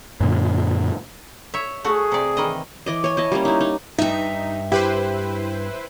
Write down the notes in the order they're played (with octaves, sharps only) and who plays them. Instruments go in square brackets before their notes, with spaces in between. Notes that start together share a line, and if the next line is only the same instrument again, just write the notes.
[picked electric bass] F#2 A#2 D3
[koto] C#5 E5
[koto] A3 F#4 [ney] G#4
[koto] C3 D5
D#3 E3 D#5
[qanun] E3 D5 D#5
C#5 G#5
E4 D#5 A5
G3 A#3 C#4
D#4 E4
D#4
[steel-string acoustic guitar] G2 E5 [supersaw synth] D#4
[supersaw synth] E4 B4 C5 [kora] G4